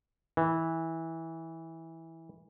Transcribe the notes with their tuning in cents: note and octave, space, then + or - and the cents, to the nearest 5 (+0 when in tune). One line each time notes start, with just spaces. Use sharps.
E3 -15